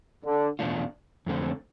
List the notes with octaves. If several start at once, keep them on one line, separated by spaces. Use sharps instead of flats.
D3
E2 B2 A3 D4 F4
F2 D3 A3 C4